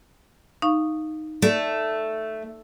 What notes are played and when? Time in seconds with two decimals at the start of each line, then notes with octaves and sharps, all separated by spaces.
0.62 D#4 F5 C#6
1.42 A3 D5